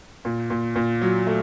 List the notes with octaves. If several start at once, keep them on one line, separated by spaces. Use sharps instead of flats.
A#2
A#2
A#2
F#3
A3